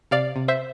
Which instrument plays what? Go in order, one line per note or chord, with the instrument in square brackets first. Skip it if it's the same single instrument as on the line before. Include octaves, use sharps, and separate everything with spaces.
[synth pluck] C3 D5 F5
C3
C5 E5